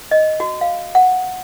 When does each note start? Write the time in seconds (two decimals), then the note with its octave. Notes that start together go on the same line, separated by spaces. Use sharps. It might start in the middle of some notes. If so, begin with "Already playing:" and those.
0.11 D#5
0.40 F#4
0.61 F5
0.95 F#5